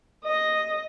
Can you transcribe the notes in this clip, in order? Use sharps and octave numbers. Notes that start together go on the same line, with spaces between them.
D#5